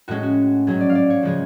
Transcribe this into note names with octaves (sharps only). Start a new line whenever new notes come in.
A2 G#3 C#4 F#4
F#4
G#2 F#3 C#4 G#4
D5
F5
D5
C#5
C#3 F3 G#3 G#4